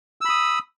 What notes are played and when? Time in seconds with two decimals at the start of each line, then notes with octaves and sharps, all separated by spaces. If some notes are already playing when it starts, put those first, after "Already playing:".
0.21 E6
0.25 B5
0.29 D#6